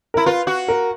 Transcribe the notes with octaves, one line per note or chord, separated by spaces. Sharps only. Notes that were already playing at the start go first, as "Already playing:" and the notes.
E4 A#4
F4 B4
F#4
A#4